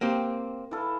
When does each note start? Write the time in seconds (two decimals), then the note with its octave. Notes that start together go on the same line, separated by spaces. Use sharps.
0.01 A#3 C4 G4
0.71 E3 A4 F5